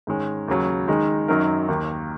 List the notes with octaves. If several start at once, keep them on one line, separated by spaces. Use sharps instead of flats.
G#2 D#3 G#3 C#4
D#2 C#3 F#3
D#3 G#3 D#4
F#2 D#3 F#3 D#4 A#4
D#2 D#3 A#3